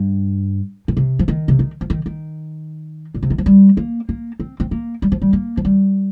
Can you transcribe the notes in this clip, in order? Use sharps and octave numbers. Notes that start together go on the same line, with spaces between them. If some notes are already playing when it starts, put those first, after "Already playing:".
Already playing: G2
A#2
C3
F3
D#3
C3
D#3
F3
D#3
D#3
A#2
C3
D#3
F3
G3
A#3
A#3
C4
C4
A#3
G3
F3
G3
A#3
F3
G3